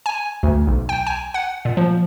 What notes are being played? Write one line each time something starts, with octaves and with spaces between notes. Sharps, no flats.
G#5
D2
B1
G5
G#5
F#5
A#2
F3